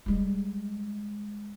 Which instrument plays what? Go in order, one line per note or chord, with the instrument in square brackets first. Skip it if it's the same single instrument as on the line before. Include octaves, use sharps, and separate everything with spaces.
[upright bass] G3 G#3